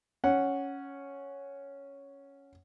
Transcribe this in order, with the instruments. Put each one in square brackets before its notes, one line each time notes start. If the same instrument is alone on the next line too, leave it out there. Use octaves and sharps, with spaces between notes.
[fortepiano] C#4 F#5